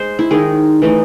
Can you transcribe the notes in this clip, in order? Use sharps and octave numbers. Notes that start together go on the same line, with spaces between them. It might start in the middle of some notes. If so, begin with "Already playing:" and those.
Already playing: G#3 C5
E4
D#3 G#3 D#4 G#4
E3 A3 D#4